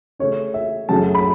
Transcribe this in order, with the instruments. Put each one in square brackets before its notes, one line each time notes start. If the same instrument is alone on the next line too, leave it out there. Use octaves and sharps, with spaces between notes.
[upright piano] C#3 A3 C#4 C#5
E5
F#2 C#3 F#3 A3 C#4 A5
B5